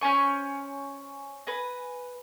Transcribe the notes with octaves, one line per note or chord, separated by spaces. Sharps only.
C#4 C5 G#5 C#6
B4 G#5 A#5